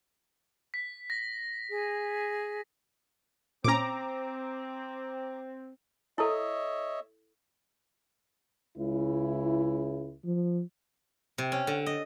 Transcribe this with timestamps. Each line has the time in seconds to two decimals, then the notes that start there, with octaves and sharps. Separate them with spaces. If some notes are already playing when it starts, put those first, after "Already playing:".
0.74 B6
1.10 A#6
1.70 G#4
3.64 A#2 C4 C#4 A#5 D6
6.18 E4 A4 C#5 D#5 E5
8.77 C#2 C#3 E4
10.24 F3
11.38 C3
11.52 C#4
11.67 D3
11.86 D#5